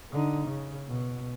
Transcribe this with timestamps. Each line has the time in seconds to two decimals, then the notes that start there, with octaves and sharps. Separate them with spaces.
0.12 D3 D#4
0.47 C#3
0.87 B2